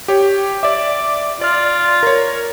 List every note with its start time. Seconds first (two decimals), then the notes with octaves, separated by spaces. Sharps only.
0.08 G4 C#5
0.63 D5 E5 D6
1.41 F4 D5 F6
2.03 A#4 C#5